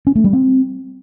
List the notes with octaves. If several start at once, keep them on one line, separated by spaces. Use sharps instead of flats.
C#4
A3
G3
C4